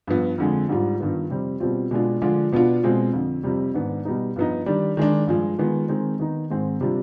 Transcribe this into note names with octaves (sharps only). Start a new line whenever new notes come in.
G2 F3 B3
F2 D3 F3 G#3
G#2 G3 D4 F4
G2 D#3 B3 F4
F2 C3 G3 C4
B2 G3 C4 F4
B2 G#3 D4 F4
D3 F3 G#3 D4 F4
B2 B3 D4 F4
B2 G#3 C4 F4
F2 D3 F3
F2 C3 G3
G#2 D#3 B3 D4
B2 G3 B3 D#4
G2 F3 B3 D#4
D#3 G3 D4
D#3 G#3 D4
G2 F3 G#3
D#3 G#3 B3 F4
D#3 G#3 C4
D#3 B3 D#4
G#2 D#3 G#3 C4
C3 G3 D4 F4